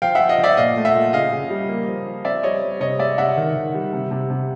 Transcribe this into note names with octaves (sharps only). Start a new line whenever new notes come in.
F3 F5 G5
F3 E5 F#5
D#5 F5
F3
D5 E5
A#2 D#5 F5
A3
E5 F#5
A#2
C#3 D#5 F5
C#3
G3
A#3
F3
F3
C4 D5 E5
G3 C#5 D#5
G3
C3 C#5 D#5
G#3 D5 E5
C3 E5 F#5
D#3
D#3
G3
C3
C3
C3